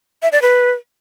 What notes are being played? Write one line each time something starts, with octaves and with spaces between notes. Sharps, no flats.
E5
D5
B4